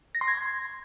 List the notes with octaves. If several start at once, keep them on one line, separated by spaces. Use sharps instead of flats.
A#6
C6
G#6